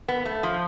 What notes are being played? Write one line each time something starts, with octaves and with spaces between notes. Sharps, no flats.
B3
A3
F3